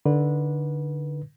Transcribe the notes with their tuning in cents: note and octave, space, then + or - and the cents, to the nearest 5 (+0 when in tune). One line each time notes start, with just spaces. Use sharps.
D3 +0 D#4 +0 B4 -20